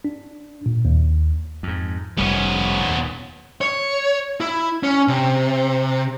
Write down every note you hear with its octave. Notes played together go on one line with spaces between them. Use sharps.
D4
A#2
D#2
F2 G#2
F1 G3 B3 C#4
D#2 A#2
C#5
E4
C#4
C3